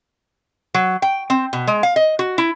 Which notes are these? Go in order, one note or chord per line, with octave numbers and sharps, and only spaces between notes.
F#3
G5
C4
B2
G#3
F5
D#5
F#4
E4